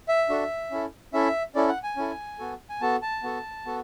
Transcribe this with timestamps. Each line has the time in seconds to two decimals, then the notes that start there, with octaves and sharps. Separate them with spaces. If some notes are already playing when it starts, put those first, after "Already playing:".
0.08 E5
0.29 D4 F#4 A4
0.71 C#4 E4 A4
1.13 C#4 E4 A4 E5
1.55 C#4 E4 A4 D5
1.69 F#5
1.83 G#5
1.97 C#4 E4 A4
2.39 B3 F#4 A4
2.69 G#5
2.81 B3 F#4 A4 A5
3.02 A5
3.23 B3 F#4 A4
3.65 B3 F#4 A4